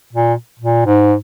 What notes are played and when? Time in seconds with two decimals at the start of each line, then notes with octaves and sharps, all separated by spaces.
0.13 A#2
0.59 A#2
0.86 G#2